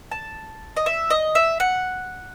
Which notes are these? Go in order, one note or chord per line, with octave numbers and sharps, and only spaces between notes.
A5
D#5
E5
D#5
E5
F#5